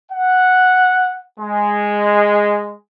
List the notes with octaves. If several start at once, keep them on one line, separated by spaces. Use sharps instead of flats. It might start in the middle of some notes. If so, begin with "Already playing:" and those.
F#5
G#3